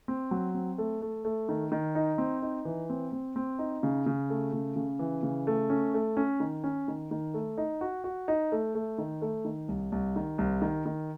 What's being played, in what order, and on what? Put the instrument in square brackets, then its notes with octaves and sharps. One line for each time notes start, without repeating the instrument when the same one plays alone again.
[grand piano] C4
F#3
C4
A3
A3
A3
D#3
D#3
D#4
C4
D#4
E3
C4
C4
C4
D#4
C#3
C#3
A3
C#3
C#3
E3
C#3
A3
C#4
A3
C#4
D#3
C#4
D#3
D#3
A3
D#4
F#4
F#4
D#4
A3
A3
D#3
A3
D#3
C2
C2
D#3
C2
D#3
D#3